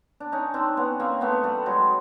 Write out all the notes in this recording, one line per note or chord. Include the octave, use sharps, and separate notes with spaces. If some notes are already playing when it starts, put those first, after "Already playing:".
D4
C#4 D#4
C4 D4
B3 C#4
A#3 C4
A3 B3
G3 A3
F#3 G#3